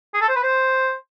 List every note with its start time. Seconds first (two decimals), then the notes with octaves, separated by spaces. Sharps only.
0.14 G#4
0.21 A4
0.29 C5
0.36 B4
0.43 C5